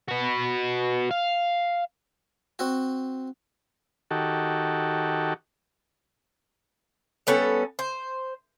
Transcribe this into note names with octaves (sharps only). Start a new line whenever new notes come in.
F#4 B4
F5
C4 F#4
D#3 F#4 G4 A4
G3 B3 C#4 A4
C5